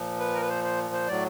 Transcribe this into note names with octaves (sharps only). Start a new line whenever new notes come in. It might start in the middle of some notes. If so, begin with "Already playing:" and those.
Already playing: A#2 F3
B4
A#4
B4
C5
C5
C5
A2 F#3 D5